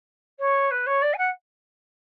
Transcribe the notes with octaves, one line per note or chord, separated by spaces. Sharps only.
C#5
B4
C#5
D5
G#5
F#5